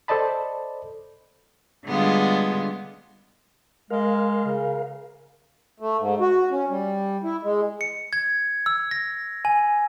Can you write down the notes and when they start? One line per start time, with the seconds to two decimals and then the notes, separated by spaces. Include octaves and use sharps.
0.08 A4 C5 D5 D#5 A5 B5
1.85 D3 G3 G#3 B3 F4
3.90 G#3 A#4 F5
4.45 C#3
5.80 A3
5.99 G#2
6.20 F#4
6.51 C#4
6.69 G3
7.24 E4
7.43 G#3
7.81 C#7
8.13 G#6
8.66 E6
8.91 A#6
9.45 G#5